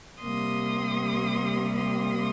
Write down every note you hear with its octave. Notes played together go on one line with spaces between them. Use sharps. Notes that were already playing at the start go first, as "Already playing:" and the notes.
C3 G3 A#3 C6 D#6
C6 D#6